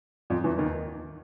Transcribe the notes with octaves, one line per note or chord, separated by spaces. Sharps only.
F2 F3
E2 E3
D#2 D#3